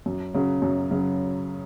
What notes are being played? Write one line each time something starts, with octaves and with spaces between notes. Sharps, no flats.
F#2
C#3 F#3
F#2
C#3 F#3